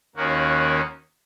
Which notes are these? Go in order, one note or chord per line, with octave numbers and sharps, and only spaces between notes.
D#2 D#3 A#3 C#4 F#4